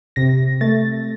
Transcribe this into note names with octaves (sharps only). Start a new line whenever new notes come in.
C3 A#6
A3 A6